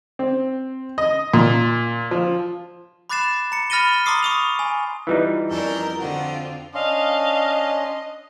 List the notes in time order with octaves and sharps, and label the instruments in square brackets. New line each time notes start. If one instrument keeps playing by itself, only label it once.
[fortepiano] C4
D#5
A#2
F3
[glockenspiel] B5 D6 F#6 A6 C7 E7
A#5 C#7
B5 F6 A6 A#6 D#7 G7
A#5 C6 D6 D#6 C7
C#6 D#6 F7
G#5
[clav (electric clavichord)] E3 G3 D#4 [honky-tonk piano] F4 B4 E5
[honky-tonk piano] F2 [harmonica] C#4 D4 A#5 [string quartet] A#4 G6
[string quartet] D3 C4 F4 [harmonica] F#4
[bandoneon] C#4 D4 C6 [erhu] D#5 [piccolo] F5